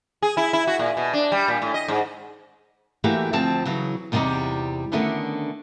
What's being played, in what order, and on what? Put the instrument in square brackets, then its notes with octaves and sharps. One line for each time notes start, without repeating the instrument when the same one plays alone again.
[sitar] G#4
E4
E4
F#4
A#2
B2
D4
G3
A#2
A2
D#5
G#2
[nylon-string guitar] E3 A3 A#3 F#4 G4 E5
D2 F3 C4 A5
C#3 E3 F#3
E2 C3 G3 A3 D#4 D5
D3 D#3 A3 B3 C#4 D4